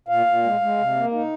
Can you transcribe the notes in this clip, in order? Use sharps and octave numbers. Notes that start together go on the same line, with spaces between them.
A#2 F5
A#2
G#3
G#3
C3
A#3
D#4